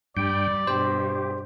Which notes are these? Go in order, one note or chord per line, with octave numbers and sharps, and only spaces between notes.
G2 G3 D5 G5
G2 B2 G4 C5